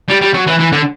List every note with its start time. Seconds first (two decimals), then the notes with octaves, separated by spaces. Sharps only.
0.09 G3
0.21 G3
0.34 F#3
0.47 E3
0.59 E3
0.72 D3